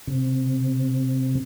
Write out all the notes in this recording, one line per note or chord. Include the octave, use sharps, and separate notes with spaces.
C3